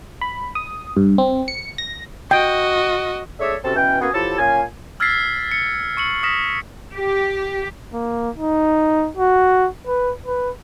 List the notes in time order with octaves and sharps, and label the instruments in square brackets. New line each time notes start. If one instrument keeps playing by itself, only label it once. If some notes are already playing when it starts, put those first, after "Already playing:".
[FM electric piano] B5
D#6
G2
C4
C#7
A#6
[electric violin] F#4 D#5 [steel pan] G5
[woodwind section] A3 D4 G#4 C#5 D5 E5
C3 C4 C#4 F#4 A4
B2 E3 C#4 G5
A#3 B3 C#4 F#4 G#4
F3 F#3 E4 G4 A4
A#2 C#4 F5 G#5
[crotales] E6 F6 G#6 A6 B6 C7
C#7
C#6 C#7 F#7
D#6 F6 A#6 B6 E7
[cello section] G4
[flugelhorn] A#3
D#4
F#4
B4
B4